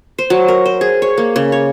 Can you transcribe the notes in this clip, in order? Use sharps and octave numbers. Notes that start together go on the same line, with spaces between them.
C5
F#3
A#4
C5
G#4
C#5
A#3
C#3
C#5